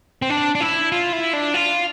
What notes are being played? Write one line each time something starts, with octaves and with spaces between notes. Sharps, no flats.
C4
D4
D4
E4
F4
E4
D4
F4